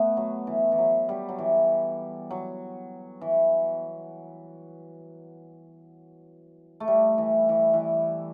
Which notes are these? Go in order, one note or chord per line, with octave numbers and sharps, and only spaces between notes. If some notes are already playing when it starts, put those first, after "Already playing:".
Already playing: A3 B3
F#3
E3
E3
F#3
G3
F#3
E3
F#3
E3
A3
G3
E3
E3
E3